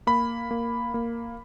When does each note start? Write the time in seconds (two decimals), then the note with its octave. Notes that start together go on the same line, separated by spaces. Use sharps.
0.07 A#3 B5
0.51 A#3
0.94 A#3